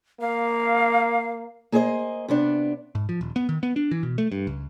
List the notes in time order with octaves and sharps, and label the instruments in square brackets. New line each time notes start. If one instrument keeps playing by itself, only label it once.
[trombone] A#3 [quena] F5
[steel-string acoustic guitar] A#3 G#4 C5 C#5 D#5
C3 B3 D4
[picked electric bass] G#2
F3
D#1
B3
D#3
B3
D4
E3
B2
A3
G2
C#2